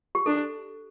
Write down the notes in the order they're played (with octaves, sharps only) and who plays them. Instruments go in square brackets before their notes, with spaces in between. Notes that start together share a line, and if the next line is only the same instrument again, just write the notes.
[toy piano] G4
[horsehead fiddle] D4 [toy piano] A4